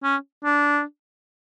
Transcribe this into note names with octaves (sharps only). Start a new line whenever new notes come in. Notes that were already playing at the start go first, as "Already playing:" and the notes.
C#4
D4